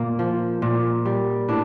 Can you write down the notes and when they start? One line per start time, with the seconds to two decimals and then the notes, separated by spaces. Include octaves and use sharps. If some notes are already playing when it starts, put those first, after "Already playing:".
Already playing: A#2 A#3
0.19 F3
0.62 A#2
1.05 G3
1.48 A2 D4